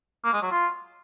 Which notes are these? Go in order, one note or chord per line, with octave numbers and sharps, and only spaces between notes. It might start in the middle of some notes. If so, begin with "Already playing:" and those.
A#3
G#3
F#3
F4